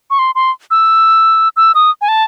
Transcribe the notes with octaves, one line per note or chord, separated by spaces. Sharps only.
C#6
C6
C6
E6
E6
D#6
G#5
A5